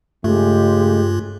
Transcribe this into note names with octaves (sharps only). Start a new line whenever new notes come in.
G2 C#3 G#3 A3 F4 G4